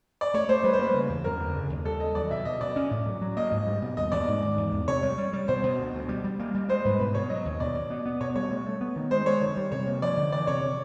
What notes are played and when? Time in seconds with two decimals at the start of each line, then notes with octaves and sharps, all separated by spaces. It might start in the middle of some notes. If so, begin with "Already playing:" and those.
0.21 D5
0.34 A3 C#5
0.49 A3 C5
0.64 G3 B4
0.73 C5
0.79 A#3 B4
0.94 C#3
1.09 E2
1.24 F#2 A#4
1.40 D3
1.55 C#3
1.70 D#2
1.85 G3 A4
2.00 D#2 D#5
2.15 F#3 D5
2.30 B2 E5
2.45 B2 D#5
2.61 B2 D5
2.76 C#4
2.91 A2
3.06 F#3
3.21 F#3
3.37 A#3 D#5
3.52 G#2
3.67 G3
3.82 B2
3.97 D#2 D#5
4.12 D#2 D5
4.28 G#2
4.42 G#2
4.57 E2
4.72 E2
4.88 C3 C#5
5.03 G3
5.18 G3
5.33 G3
5.48 B2 C5
5.63 B2
5.79 D2
5.94 D2
6.09 G3
6.24 G3
6.39 A#3
6.55 G3
6.69 G#3 C5
6.84 G#2 B4
6.99 B2 B4
7.15 B2 C#5
7.30 F#3 D#5
7.45 D#2
7.60 B2 D5
7.75 B2
7.90 B3
8.05 B3
8.20 B2 C#5
8.36 G3 C#5
8.51 A3
8.66 A3
8.81 B3
8.96 D#3
9.11 G#3 C5
9.26 G#3 C#5
9.41 D#3
9.57 G3
9.72 C3 C#5
9.87 A#3
10.02 F3 D5
10.17 D3
10.32 E3 D5
10.47 C3 C#5